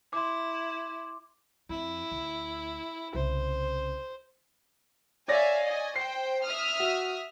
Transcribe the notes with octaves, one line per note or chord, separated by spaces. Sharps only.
E4 C6 D6
F2 E4
D2
C2 C#3 C5
C#5 D5 E5 F5 G#5 A#6
D#5 G#5
C5 G5 C7
E5 D#6 F6
F#4